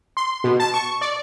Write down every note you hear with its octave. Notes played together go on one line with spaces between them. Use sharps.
C6
B2
A5
C#6
D5